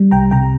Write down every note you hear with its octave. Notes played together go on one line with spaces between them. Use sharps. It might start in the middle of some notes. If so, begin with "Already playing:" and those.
Already playing: G3
C2 G5 A#5
C3 G5 A#5